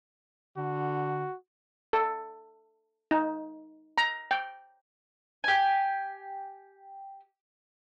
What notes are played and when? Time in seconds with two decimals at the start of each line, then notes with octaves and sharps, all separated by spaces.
0.57 D3 F#4
1.93 A4
3.11 D#4
3.98 A#5
4.31 G5
5.44 G4 G#5